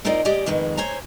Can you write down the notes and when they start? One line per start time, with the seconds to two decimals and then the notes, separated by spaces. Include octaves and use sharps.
0.05 C4 D#4 F4 A#4 D5 D#5
0.25 G#3 G4 D5 D#5 G#5
0.46 F2 G#2 D#3 G#3 B4
0.77 C5 C#5 G#5 A#5